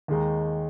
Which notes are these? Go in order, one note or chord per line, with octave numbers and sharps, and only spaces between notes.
D#2 D#3 G#3 D#4